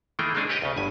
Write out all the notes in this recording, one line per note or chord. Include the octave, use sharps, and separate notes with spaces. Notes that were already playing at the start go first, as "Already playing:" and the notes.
D#3 E3 A3 A#3 G#4 G5
G#3 A#3 C4 D4 D#4 G#4
G4 B4 C#5 D#5 F#5 G5
D2 C#3
G1 G2 G#5